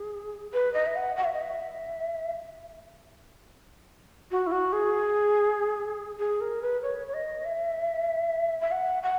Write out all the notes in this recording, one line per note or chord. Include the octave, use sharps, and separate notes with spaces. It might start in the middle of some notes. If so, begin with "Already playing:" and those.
Already playing: G#4
B4
D#5
E5
F#5
F#5
E5
D#5
E5
F#4
E4
F#4
G#4
G#4
A#4
B4
C#5
C#5
D#5
E5
E5
F#5
F#5